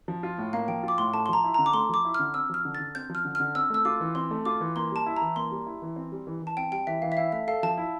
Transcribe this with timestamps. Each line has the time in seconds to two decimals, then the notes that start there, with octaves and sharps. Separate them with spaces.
0.08 F3
0.23 F4
0.38 A2
0.53 A#3 F5
0.68 F3 G5
0.83 F4 D6
0.98 A2 C6
1.13 A3 A5
1.26 C6
1.29 F3 A#5
1.44 E4
1.54 A#5
1.59 D3
1.66 D6
1.74 A3 C6
1.89 F3 D6
2.05 E4
2.14 F6
2.19 D3
2.34 C4 E6
2.49 F3 F6
2.65 D3
2.75 A6
2.80 D3
2.95 C4 G6
3.10 F3
3.15 F6
3.25 D3
3.35 F6
3.40 D3
3.55 C4 E6
3.70 A3 E6
3.85 F4 D6
4.00 E3
4.15 C4 C6
4.31 A3
4.45 F4 D6
4.60 E3
4.76 A#3 C6
4.91 G3 A5
5.06 E4
5.17 A#5
5.21 E3
5.36 A#3 C6
5.51 G3
5.66 E4
5.82 E3
5.96 C4
6.12 G3
6.27 E3
6.42 E3 A5
6.57 C4 G5
6.72 G3 G5
6.87 E3 E5
7.02 E3 F5
7.12 E5
7.17 E4 F5
7.32 A3 E5
7.48 A4 F5
7.63 F3 A5
7.78 E4